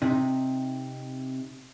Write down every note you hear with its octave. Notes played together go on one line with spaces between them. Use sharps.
C3 D#4